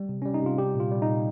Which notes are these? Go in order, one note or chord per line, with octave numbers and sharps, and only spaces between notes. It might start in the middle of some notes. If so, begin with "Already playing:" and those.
Already playing: G3
C3
G3 C#4
D#4
C3 F4
G3 G4
A#2 F4
G3
D#4
A#2